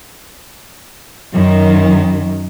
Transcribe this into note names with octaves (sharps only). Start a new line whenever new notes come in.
F#2 D#3